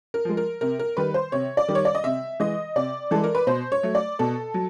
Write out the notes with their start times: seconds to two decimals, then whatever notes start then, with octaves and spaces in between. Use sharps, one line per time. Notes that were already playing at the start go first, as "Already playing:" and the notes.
0.14 A#4
0.25 F3 G#3
0.37 A#4
0.61 C3 A#4
0.79 A#4
0.97 D#3 G3 B4
1.14 C5
1.32 C3 C#5
1.57 D5
1.68 D#3 G3
1.75 C#5
1.85 D5
1.95 D#5
2.04 C3 E5
2.40 E3 G#3 D#5
2.76 C3 D5
3.11 E3 G#3 A4
3.24 A#4
3.35 B4
3.47 B2 C5
3.72 C#5
3.83 F#3 A3
3.95 D5
4.19 B2 A4
4.54 F#3